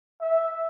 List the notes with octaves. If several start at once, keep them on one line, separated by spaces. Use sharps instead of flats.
E5